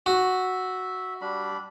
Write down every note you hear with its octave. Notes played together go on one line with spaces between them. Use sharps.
F#4 E5
G3 D4 B5